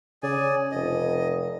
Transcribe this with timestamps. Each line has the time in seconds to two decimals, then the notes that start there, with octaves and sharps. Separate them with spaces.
0.23 C#3 G#4 D5 G#5
0.71 F1 D#5